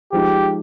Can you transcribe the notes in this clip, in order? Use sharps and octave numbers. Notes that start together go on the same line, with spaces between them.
F3 G#3 D#4 G4